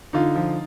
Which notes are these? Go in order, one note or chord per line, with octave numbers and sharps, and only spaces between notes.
D3 D#4 F4
F3